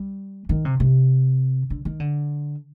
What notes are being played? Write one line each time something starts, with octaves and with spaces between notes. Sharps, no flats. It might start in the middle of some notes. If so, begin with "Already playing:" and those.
Already playing: G3
D#3
C3
C3
D3
D#3
D3